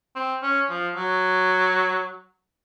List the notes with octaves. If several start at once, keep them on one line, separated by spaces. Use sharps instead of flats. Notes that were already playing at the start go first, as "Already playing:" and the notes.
C4
C#4
F3
F#3